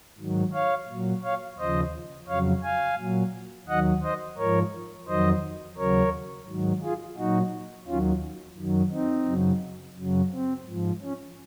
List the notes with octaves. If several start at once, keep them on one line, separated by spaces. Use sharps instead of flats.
G#2 D#3 F#3
C#5 F5
A#2 F#3
C#5 F5
D#2 C#3 F3 C5 D#5
F2 C#3 F#3 C#5 F5
F5 G#5
A#2 F#3
D#2 D#3 F#3 D#5 F#5
C5 D#5
G#2 F3 A#4 C#5
F2 D#3 F#3 C5 D#5
D#2 C#3 F#3 A#4 C#5
G#2 D#3 F#3
F4 G#4
A#2 F#3 D#4 F#4
D#2 D#3 F#3 C#4 F4
F#2 D#3 F#3
C4 D#4
F#2 C#3 F#3
F#2 C#3 F#3
C4
G#2 F3
C#4